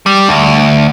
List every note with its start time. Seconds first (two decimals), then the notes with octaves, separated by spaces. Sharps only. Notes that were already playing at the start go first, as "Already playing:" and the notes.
0.06 G3
0.29 D2